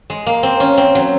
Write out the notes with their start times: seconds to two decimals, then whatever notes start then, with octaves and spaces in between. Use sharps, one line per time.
0.10 G#3
0.26 A#3
0.43 C4
0.60 C#4
0.77 C4
0.95 F#3